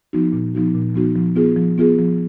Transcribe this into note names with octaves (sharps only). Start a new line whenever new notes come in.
F3 B3 D#4 F#4
A#2
F3 B3 D#4 F#4
A#2
F3 B3 D#4 F#4
F3
B3 F4 G#4
F3
B3 F4 G#4
F3